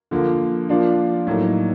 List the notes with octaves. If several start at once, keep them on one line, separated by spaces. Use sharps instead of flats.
D3 F3 A#3
F3 A#3 D4 F4
A2 F#3 A#3 D#4